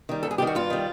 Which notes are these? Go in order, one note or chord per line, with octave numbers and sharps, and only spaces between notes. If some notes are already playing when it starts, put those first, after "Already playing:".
D#3 G3
G2 A4
G#4
D#3 G3 G4
F#4
G2 F4
D#3 G3